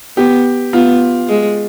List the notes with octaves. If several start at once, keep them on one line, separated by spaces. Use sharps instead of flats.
B3 G4
B3 F4
G#3